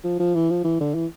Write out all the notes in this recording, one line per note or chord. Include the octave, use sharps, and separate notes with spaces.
F3
F3
E3
F3
E3
D3
E3